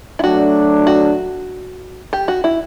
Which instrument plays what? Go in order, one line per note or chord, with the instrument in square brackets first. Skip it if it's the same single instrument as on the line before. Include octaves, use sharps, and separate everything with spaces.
[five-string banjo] E4
[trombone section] F#3 A3 D4 [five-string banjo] F#4
[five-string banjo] F#4
G4
F#4
E4